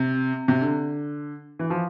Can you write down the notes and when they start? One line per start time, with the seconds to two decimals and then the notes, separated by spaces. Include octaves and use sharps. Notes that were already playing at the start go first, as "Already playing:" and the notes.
Already playing: C3
0.48 C3
0.61 D3
1.59 E3
1.70 F3